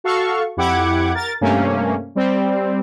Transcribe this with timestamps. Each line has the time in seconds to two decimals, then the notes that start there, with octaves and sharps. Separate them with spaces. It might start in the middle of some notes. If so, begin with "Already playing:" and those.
0.04 F#4 A4 F5 C#6
0.57 F2 E4 G4 F#5 D6 G#6
1.15 A#4 A6
1.41 G2 C3 A3 A#3 C#4
2.15 G3 C4